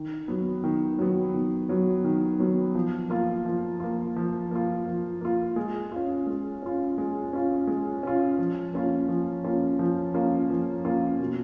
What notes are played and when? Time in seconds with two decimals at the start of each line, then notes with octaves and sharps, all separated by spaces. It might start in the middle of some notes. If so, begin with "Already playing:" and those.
Already playing: D#3
0.28 F#3 B3
0.64 D#3
0.99 F#3 B3
1.34 D#3
1.69 F#3 B3
2.04 D#3
2.40 F#3 B3
2.75 F3
3.10 A#3 F4
3.46 F3
3.80 A#3 F4
4.16 F3
4.51 A#3 F4
4.86 F3
5.21 A#3 F4
5.56 G#3
5.92 C#4 F4
6.27 G#3
6.62 C#4 F4
6.98 G#3
7.33 C#4 F4
7.67 G#3
8.03 C#4 F4
8.38 F3
8.74 A#3 C#4 F4
9.08 F3
9.44 A#3 C#4 F4
9.79 F3
10.14 A#3 C#4 F4
10.50 F3
10.85 A#3 C#4 F4
11.19 B2